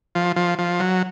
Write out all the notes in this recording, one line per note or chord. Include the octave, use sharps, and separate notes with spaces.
F3
F3
F3
F#3